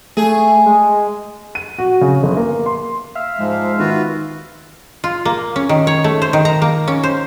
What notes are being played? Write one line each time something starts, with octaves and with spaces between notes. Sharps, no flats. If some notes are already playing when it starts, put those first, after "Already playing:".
A3 G#4
G#3
D#7
F#4
C#3
G1
A#3
C6
E5 F5
G#2 F3 G#3
D#3 F4 F#4 B4
F4
A#3
C#4
D#3
C#5
A3
C5
D#3
A#5
A#3
C#4
C5